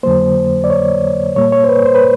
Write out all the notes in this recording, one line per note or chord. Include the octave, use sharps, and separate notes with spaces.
F2 D3 F#3 A#3 C5
D5
C#5
A#2 G3 A#3 C#5
C#5
C5
B4
C5
B4